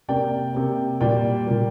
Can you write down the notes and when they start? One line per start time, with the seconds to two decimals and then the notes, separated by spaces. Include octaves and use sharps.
0.09 C3 A#3 D5 G5
0.55 C3 A#3
1.01 A#2 G3 A#3 D5 G5
1.46 A#2 G3 A#3